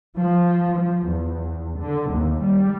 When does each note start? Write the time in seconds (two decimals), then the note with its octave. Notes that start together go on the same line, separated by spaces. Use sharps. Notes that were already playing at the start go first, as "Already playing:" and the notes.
0.18 F3
0.77 F3
1.07 E2
1.78 D3
2.13 D#2
2.43 G3